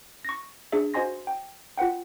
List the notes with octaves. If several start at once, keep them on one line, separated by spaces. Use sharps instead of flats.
C#6 A#6
D4 G#4 E5
F#4 C5 D#5 G#5 C6 A#6
G5
F4 B4 F#5 G5